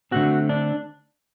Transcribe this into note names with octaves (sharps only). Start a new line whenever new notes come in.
D3 A3 C4 F#4
D4